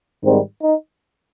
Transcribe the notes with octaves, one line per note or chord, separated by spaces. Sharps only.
G#2 D#3 G3 C4
D#4